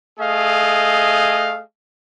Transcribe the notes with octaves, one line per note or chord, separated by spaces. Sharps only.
A3 G#4 D#5 F5